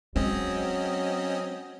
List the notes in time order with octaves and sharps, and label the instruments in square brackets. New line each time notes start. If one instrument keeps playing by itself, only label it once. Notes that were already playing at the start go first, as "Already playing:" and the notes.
[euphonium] F#3 [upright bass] G#3 [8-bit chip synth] C4 C#4 D#5